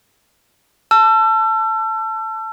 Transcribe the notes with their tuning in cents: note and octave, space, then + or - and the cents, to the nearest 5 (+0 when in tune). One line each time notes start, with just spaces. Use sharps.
A5 +0 E6 +35